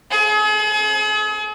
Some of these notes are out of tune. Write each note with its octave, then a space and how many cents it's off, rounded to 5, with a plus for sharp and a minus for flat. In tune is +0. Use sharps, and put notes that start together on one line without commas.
G#4 +40